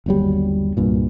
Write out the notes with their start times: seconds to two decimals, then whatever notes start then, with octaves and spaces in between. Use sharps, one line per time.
0.06 G1 D#2 F#3 G3
0.77 C2 G2 A#2